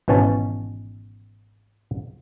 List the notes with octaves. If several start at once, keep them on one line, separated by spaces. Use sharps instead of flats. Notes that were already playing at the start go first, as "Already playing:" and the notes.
G#1 B2 E3 C#4 A5